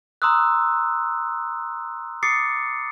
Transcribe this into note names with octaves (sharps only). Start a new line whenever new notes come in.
A#5 C6 D#6 E6 F#6
D6 D#6 A6 C7 C#7